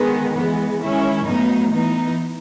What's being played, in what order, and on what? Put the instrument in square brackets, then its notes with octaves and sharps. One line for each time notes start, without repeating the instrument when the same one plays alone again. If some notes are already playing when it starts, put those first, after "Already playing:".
Already playing: [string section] D#3 G#3 B3
E3 G#3 B3
D#3 G#3 C#4 E4
A2 F#3 B3 D#4
E3 B3 D#4